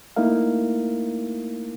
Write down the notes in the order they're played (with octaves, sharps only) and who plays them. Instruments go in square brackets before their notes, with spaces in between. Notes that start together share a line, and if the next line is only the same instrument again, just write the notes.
[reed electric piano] A3 A#3 D#4 E4 A#4 F5